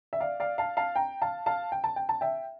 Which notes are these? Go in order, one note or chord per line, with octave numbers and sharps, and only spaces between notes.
E5
D5 F5
D5 F5
F5 A5
F5 A5
G5 A#5
F5 A5
F5 A5
G5
A5
G5
A5
E5 G5